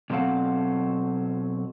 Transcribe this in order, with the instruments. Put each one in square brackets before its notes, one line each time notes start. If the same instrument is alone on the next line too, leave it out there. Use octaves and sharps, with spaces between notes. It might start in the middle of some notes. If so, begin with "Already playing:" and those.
[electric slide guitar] B2 F#3 C4 A4 F5 F#5